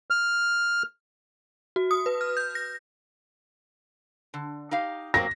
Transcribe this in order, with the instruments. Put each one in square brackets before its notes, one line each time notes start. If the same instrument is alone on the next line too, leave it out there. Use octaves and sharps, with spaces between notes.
[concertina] F6
[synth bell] F#4
D#6
B4
F6
G6
A#6
[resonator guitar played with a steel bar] D3
D#4 G4 F5
[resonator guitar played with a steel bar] F#3 A#3 C4 [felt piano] A#6